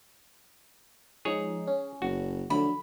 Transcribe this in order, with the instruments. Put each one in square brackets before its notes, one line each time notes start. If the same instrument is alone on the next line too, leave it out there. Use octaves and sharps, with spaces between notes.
[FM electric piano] F3 G#3 D#4 [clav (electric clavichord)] G#4 C#5
[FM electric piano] C#4
[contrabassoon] F#1 [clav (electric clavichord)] F#4
[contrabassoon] D3 [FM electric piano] F3 F#3 A3 [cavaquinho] B5